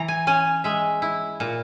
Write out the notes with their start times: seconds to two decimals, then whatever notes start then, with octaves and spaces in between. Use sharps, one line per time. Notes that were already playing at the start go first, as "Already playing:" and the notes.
Already playing: E3 A#5
0.08 G#5
0.27 C#4 G#5
0.64 G#3 E5
1.02 E4
1.40 A#2